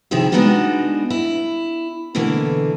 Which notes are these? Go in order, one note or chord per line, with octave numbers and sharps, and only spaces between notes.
C3 D#3 F3 E4 G#4 E5
G#3 B3 D4 D#4 F4 F#4
E4
B2 D3 E3 A3 A#3